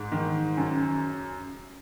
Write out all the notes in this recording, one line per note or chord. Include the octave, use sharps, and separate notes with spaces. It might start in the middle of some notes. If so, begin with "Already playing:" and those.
Already playing: G#2
D#3
F#2